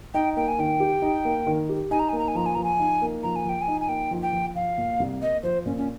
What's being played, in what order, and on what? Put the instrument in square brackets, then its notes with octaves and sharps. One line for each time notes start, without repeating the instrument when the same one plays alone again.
[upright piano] D#4 [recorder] G5
[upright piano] A#3 [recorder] G5
[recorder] G#5
[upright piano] D#3 [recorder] G5
[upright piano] G4
D#4
A#3
D#3
G4
[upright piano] D#4 [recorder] G#5
[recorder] A#5
[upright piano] A#3 [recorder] G#5
[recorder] A#5
G#5
[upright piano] F3 [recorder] A#5
[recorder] G#5
[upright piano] F3 [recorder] A#5
[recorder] G#5
[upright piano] D#4
A#3
[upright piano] F3 [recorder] A#5
[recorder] G#5
[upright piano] F3 [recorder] G5
[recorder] G#5
[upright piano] D#4
[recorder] G#5
[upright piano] A#3 [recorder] G5
[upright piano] F3
[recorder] G5
[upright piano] F3
[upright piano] F3 [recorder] F5
[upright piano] A#2
C2
[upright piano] A#3 [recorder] D#5
[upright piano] F3 [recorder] C5
[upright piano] A#2 [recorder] C#4
[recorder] C#4